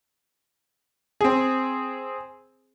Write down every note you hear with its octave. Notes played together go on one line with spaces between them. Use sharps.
C4 G#4